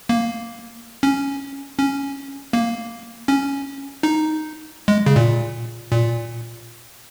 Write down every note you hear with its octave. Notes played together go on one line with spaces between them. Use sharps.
A#3
C#4
C#4
A#3
C#4
D#4
G#3
C#3
A#2
A#2